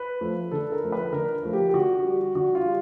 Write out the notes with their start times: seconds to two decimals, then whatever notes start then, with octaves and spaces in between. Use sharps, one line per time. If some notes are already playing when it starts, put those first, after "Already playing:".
Already playing: B4
0.21 F3 A3
0.51 D3 A4
0.72 A#4
0.82 F3 A3
0.92 B4
1.13 D3 A#4
1.43 F3 A3
1.53 G4
1.69 G4
1.74 D3 F#4
2.04 G3
2.35 D3 F#4
2.55 F4
2.66 G3